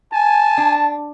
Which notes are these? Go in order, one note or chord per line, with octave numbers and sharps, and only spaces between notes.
G#5 A5
D4